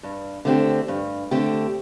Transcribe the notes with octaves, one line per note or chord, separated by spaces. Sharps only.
G2
D3 A3 C4 G4
G2
D3 A3 C4 G4